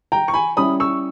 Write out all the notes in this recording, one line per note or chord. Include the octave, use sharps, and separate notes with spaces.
G5 A#5
C#6
G#5 B5
G3 C#4 E4 B5 D#6
C#6 E6